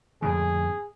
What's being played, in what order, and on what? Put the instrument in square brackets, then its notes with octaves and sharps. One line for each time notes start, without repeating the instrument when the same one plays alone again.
[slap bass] F2 A2 D3 [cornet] G#4